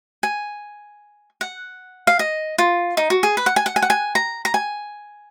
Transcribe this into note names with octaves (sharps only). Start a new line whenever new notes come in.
G#5
F#5
F5
D#5
F4
D#4
F#4
G#4
B4
F#5
G#5
F#5
G#5
F#5
G#5
A#5
A#5
G#5